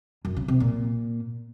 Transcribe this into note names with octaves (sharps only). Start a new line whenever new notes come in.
F#2
C#3
C3
A#2